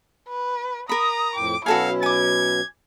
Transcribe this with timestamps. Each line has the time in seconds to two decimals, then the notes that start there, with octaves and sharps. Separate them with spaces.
0.29 B4
0.89 A#4 A#5 B5 D#6
1.36 F2 A2 G5 D6
1.66 B2 F#3 C#4 E4 F#4 A4 F5 G#5
2.03 G#5 D6 G#6